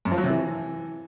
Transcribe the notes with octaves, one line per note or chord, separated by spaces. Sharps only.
F#2
F3
F#3
C3
E3